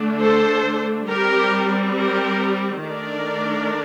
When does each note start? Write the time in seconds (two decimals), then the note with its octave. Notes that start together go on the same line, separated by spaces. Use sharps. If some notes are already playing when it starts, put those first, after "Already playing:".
Already playing: D3 A3 D4
0.20 A4 C5
1.09 G3 C4 G4 A#4
1.96 G4 A#4
2.85 D#3 A3 D4 A#4 D5